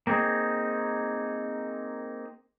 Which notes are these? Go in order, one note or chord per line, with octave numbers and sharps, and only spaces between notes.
A#3 C4 D#4 G#4